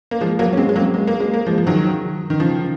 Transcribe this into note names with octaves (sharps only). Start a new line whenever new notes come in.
A#3
F3 G#3
F#3 A#3
C#4
G#3 C4
G#3
F#3 A#3
G#3
A#3
G#3
A#3
F3 G#3
F3
D#3 F#3
D#3
C#3 F3